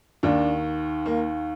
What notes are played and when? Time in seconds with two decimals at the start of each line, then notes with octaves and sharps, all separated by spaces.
0.23 D#2 D#3 D4
1.06 A#3